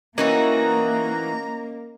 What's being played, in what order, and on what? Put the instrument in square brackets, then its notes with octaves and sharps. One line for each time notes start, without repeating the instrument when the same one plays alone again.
[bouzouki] E3 D#4 F#4 [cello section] A#3 [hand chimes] C#4 A#4 D#5 [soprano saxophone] A#5